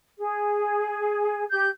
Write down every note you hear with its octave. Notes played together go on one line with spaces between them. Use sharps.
G#4
G4 G6